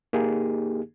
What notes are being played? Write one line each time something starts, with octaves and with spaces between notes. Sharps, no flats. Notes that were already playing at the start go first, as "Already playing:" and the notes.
A#3 D#4 G4 G#4